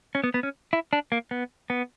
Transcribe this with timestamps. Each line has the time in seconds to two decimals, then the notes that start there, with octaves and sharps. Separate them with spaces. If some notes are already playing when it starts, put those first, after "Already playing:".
0.15 C#4
0.24 B3
0.34 B3
0.43 C#4
0.73 E4
0.93 D4
1.12 A#3
1.31 B3
1.70 B3